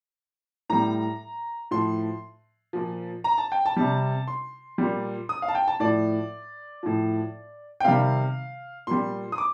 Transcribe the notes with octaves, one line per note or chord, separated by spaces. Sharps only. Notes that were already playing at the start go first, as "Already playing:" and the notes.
A2 G3 A#5
A2 F3 C6
A#2 F3
A#5
A5
G5
A5
C3 G3
C6
A#2 G3
D#6
F5
A5
G5
A5
A2 F3 D5
A2 F3
G5
C3 D#3 G3 F5
A#2 G3 C6
D#6
D6